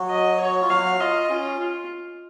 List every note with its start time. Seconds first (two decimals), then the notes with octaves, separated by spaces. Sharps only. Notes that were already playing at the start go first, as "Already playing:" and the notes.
Already playing: F#3 F#4
0.09 D#5
0.40 C#5
0.61 F4
0.69 F#3 F#4 F5
1.00 F4 D#5
1.30 C#4 F4
1.59 F4